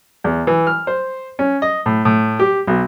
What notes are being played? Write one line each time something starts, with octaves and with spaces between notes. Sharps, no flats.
E2
E3
F6
C5
C#4
D#5
A2
A2
G4
B1